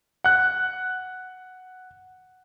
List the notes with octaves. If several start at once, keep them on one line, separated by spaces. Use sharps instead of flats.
F#5 F#6